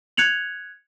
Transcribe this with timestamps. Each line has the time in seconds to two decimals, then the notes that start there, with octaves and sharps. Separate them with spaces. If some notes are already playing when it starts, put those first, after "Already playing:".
0.17 F#6 G#6 C#7 F7 F#7